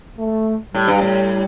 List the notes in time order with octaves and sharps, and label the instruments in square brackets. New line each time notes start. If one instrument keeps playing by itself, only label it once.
[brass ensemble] A3
[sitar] A2 [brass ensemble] G3
[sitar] G2
A2